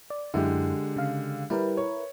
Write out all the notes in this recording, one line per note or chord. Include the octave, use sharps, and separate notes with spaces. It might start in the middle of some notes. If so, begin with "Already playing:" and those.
D5
F#2 D3 G#3 E4 G4
C#3 F5
G3 E4 A#4 B4
C#5